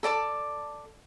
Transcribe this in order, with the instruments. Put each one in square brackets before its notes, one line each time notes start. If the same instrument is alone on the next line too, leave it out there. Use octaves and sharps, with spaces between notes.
[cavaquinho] A4 D5 A5 D6